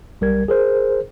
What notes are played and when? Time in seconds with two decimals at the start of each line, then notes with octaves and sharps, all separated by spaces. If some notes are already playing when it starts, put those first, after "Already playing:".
0.21 B1 G3 A#4 G#6
0.48 G#4 A#4 C5